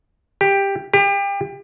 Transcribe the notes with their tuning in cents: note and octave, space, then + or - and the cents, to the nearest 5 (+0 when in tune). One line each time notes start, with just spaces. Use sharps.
G4 +10
G4 +30